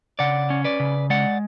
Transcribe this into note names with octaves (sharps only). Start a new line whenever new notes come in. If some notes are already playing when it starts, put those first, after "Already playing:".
C#3 D5 F#5
C#4
B4 D5
C#3
G#3 D5 F#5